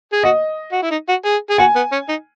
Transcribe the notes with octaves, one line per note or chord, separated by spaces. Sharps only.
G#4
F#4 D#5
F#4
E4
D#4
F#4
G#4
G#4
F#4 G#5
B3
C#4
D#4